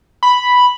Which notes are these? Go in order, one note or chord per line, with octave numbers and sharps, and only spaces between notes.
B5